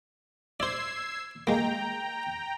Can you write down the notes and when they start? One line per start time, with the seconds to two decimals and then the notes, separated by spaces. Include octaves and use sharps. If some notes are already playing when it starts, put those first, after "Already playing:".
0.60 C5 D5 E6 G#6 C7
1.47 G#3 A#3 G5 A#5